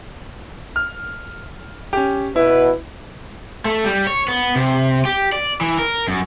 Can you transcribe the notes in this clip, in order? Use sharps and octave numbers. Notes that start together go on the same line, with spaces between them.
F6
C#4 G4
B2 E4 B4
A3
G3
C#5
B3
C3
G4
D5
E3
A#4
F#2